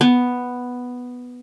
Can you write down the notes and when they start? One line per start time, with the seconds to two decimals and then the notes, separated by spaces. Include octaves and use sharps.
0.01 B3